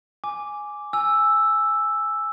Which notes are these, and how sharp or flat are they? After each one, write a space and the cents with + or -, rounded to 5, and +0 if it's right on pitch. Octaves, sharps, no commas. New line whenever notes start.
G#5 +0 D6 -5
G#5 +0 E6 +0